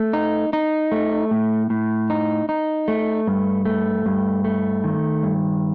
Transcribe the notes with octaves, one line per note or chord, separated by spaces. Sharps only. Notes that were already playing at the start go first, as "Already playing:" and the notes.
Already playing: A3
D#4
D#4
A3
A2
A2
D#4
D#4
A3
G2
A3
G2
A3
D#3
G2